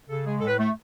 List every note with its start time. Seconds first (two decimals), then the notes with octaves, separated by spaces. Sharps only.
0.09 C#3 A4
0.25 G#3 G#4
0.40 A2 A4
0.48 B4
0.59 A3